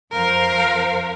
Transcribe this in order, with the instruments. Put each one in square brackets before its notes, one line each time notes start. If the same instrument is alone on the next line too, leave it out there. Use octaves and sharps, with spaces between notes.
[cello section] F2 C5 F5 [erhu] A#4